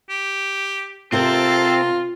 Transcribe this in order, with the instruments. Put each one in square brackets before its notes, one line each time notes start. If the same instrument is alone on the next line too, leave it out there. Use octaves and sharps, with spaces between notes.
[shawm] G4
[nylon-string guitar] C3 A#4 C5 [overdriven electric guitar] C4 [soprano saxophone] F4 [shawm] A4